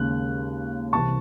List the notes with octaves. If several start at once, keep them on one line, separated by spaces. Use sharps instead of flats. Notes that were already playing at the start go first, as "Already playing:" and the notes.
Already playing: D#2 C#3 G#3 F#6
C2 C3 E3 A5 C#6